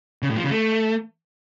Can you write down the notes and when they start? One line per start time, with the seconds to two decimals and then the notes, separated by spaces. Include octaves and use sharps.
0.23 C#3
0.30 A2
0.37 F3
0.44 C#3
0.51 A3